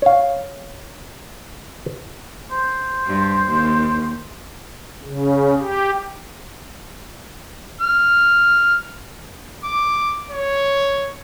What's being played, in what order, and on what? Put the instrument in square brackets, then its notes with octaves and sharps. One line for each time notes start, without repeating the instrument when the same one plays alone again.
[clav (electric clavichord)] C#5 F5
[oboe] C5
[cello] G2
D#2
[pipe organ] C#3
G4
[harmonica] F6
[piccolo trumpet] D6
C#5